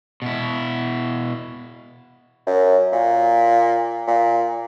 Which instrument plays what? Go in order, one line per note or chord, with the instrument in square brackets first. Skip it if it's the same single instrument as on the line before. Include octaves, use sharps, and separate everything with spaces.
[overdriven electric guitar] B2 E4
[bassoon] F#2
A#2
A#2